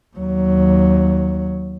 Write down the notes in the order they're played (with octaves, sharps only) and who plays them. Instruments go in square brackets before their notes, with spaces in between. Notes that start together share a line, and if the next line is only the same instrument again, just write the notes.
[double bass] D#2 F#3